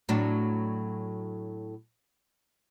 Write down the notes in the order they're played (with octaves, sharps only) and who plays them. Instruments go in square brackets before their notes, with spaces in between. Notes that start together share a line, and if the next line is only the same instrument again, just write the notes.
[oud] A2 F#3 D4